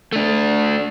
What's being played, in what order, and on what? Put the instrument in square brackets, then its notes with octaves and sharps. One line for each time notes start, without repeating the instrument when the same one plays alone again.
[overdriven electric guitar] A3 D4